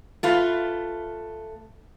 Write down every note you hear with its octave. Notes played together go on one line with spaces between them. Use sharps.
A3 F4 B4